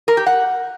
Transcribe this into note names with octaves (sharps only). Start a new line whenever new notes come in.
A#4
G4
F#5